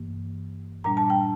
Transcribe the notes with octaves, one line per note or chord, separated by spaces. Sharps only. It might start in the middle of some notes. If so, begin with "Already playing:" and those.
Already playing: G2 E3 A#3
A#2 G3 D4 A#5
A5
G5